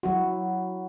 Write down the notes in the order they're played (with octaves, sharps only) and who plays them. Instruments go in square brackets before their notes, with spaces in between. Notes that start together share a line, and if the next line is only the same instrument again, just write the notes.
[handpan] F#3 E4 F#4